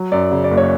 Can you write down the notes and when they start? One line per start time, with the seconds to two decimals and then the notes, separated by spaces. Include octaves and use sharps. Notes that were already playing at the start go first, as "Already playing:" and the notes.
Already playing: F#3
0.12 F#2 D5
0.31 C#3
0.44 D5
0.51 F#1
0.57 C#5